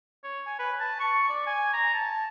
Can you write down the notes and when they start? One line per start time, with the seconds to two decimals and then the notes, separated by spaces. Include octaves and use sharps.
0.24 C#5
0.46 G#5
0.59 B4
0.80 A5
1.00 C#6
1.29 D5
1.47 G#5
1.74 A#5
1.94 A5